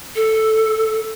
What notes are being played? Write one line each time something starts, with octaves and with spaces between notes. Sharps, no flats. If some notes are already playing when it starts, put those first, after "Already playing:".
A4